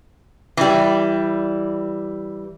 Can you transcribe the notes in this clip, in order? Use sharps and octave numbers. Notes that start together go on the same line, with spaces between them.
E3 G3